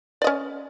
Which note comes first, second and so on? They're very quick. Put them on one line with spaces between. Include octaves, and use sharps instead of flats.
D5 D#5 C#4